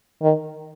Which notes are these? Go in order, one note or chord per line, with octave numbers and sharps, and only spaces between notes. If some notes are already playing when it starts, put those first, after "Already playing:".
D#3